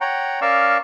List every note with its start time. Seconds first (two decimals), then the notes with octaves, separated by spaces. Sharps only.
0.01 C#5 F#5 G5 A#5
0.41 C#4 A#4 D5 F5 C#6 E6